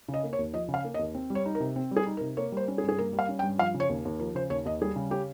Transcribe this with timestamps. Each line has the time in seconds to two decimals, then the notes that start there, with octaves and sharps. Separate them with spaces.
0.08 C#3
0.14 D#5
0.24 A#3
0.33 C#5
0.39 D#2
0.53 F3 D#5
0.68 C#3
0.74 F5
0.84 A#3
0.94 D#5
0.99 D#2
1.15 C4
1.30 G3
1.35 C#5
1.45 D#4
1.55 A#4
1.60 C3
1.76 C4
1.91 G3
1.96 G#4
2.07 D#4
2.17 A#4
2.21 C3
2.37 A#3 C#5
2.52 G3 C5
2.68 C#4
2.78 G#4
2.83 G2
2.89 G#4
2.99 A#3 A#4
3.13 G3
3.19 F5
3.29 C#4
3.39 G5
3.43 G2
3.58 F3 F5
3.74 C#3
3.80 C#5
3.89 D#2
4.05 D#2
4.19 F3 A#4
4.35 C#3 C5
4.50 D#2 C#5
4.65 D#2 D#5
4.81 G3 G#4
4.96 C#3
5.11 C#4 G4